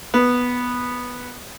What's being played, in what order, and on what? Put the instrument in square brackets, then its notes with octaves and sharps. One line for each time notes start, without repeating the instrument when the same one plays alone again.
[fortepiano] B3